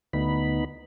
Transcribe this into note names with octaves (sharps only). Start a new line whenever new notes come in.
D2 B3 D#4 B5